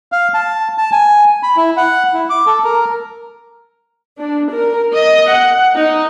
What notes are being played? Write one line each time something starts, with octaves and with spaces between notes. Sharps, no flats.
F5
A5
A5
G#5
B5
E4
F#5
E4
D6
A4
A#4
D4
A#4
D#5
F#5
D#4